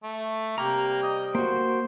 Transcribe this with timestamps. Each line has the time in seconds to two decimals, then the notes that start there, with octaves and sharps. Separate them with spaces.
0.03 A3
0.58 C3 G3 A#3 G5 A#5
1.03 D#5
1.35 A#3 F#4 C5